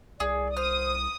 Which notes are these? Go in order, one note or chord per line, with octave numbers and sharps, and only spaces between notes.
C2 G#4 D5
C5 D#6 F6